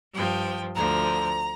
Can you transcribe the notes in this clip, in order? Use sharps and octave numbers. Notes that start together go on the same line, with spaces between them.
G2 F3 G5
D2 D3 F3 A#5